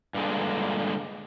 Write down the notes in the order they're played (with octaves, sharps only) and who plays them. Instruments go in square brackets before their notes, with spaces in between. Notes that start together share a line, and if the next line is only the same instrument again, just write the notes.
[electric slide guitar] G2 A#2 D3 G#3